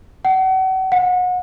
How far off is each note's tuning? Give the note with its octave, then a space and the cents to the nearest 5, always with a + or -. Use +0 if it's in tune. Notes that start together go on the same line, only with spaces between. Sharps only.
F#5 +35
F#5 -30